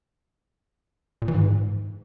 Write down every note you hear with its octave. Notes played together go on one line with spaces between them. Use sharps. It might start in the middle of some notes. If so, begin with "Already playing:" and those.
A#2
E3
G#2